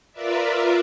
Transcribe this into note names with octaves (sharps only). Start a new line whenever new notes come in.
F4 A#4 B4 D5 E5